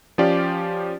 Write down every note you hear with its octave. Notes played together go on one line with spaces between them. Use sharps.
F3 C#4 F4 G4 D5